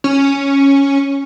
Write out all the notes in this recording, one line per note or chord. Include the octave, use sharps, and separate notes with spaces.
C#4